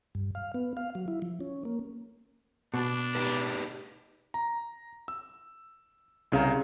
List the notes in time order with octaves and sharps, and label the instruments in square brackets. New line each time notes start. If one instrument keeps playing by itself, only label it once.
[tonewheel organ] G2
F5
B3
F5
F#3
E4
F3
C#4
A#3
[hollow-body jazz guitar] B2 [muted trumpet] D4
[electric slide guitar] D#4 G4 B4
[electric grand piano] A#5
E6
C2 C#3 F5 A#5